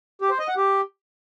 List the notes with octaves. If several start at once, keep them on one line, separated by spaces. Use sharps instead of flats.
G4
C5
D#5
F#5
G4